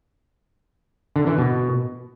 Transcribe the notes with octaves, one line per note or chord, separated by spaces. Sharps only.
D3
E3
B2